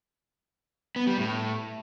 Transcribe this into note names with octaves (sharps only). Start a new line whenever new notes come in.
B3
G3
A2